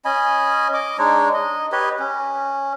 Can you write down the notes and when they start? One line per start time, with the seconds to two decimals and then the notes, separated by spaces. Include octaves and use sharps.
0.05 C#4 D#5 G#5 B5
0.74 D#5 D6
0.98 G#3 D4 D#4 C#5
1.34 D#5
1.72 G4 B4 C#5 D#5
1.99 C#4